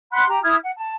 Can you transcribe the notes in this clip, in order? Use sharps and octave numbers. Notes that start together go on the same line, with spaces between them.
F#5 B5 C6 F#6
G4 A#5
E4 D#6 F6 G#6
F#5
A5